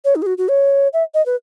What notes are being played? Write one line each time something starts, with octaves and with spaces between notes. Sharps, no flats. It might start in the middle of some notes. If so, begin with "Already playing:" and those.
C#5
D#4
G#4
F#4
F#4
C#5
E5
D#5
B4